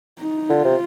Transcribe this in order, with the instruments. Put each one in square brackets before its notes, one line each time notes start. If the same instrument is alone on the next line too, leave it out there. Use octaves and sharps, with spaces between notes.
[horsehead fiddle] D#4
[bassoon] D3 [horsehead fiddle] F4
[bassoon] C3